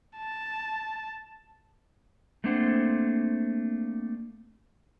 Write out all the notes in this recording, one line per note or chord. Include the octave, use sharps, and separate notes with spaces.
A5
A3 A#3 C4 D4 C5 F#5